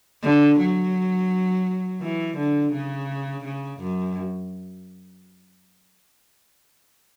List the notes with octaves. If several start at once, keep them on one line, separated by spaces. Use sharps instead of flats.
D3
F#3
E3
D3
C#3
C#3
F#2